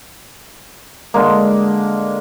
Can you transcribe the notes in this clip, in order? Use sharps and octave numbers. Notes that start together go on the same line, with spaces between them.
D3 G#3 A#3